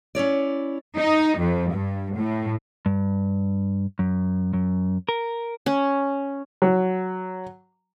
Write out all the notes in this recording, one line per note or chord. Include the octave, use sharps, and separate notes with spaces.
C#4 E4 C#5 D5
D#4
F2
G2
A2
G2
F#2
F#2
A#4
C#4
F#3